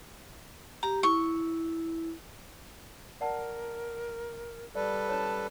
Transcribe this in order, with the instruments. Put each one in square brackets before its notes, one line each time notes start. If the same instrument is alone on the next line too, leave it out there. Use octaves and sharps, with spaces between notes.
[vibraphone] G4 [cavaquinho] A#5
[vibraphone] E4 [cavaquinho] C#6
[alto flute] A#4 [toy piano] D5 F#5 A5
[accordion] G3 A4 B4 [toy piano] D5
[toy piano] C#4 E4 C#5 [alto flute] A5